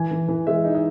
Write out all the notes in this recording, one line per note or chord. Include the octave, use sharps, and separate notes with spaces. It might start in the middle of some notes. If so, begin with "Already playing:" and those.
Already playing: E3 G#5
E3
E3
G#3 E5
D#4
D#5